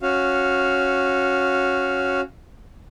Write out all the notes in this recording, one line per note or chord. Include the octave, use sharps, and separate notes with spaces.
C#4 F#4 F5